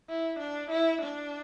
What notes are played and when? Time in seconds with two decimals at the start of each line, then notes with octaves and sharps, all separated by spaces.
0.09 E4
0.39 D4
0.71 E4
1.02 D4